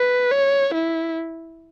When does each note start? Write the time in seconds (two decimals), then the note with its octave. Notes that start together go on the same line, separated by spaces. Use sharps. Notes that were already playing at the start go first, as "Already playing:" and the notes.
Already playing: B4
0.31 C#5
0.74 E4